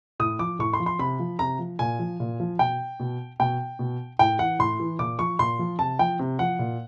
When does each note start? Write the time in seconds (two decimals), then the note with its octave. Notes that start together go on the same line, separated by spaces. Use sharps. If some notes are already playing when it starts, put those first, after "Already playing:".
0.20 A2 D#6
0.39 F3 D6
0.59 A2 C#6
0.73 C6
0.80 F3
0.86 C6
0.99 C3 B5
1.19 F3
1.39 C3 A#5
1.59 F3
1.79 A#2 G#5
1.99 F3
2.20 A#2
2.40 F3
2.59 B2 G5
3.00 B2
3.40 B2 G5
3.79 B2
4.19 A2 G5
4.39 E3 F#5
4.59 A2 C6
4.80 E3
4.99 A#2 D6
5.19 F3 C#6
5.39 A#2 C6
5.59 F3
5.79 C3 A5
5.99 F3 G5
6.19 C3
6.39 F3 F#5
6.59 A#2